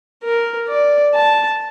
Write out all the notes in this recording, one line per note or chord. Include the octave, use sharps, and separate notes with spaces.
A#4
D5
A5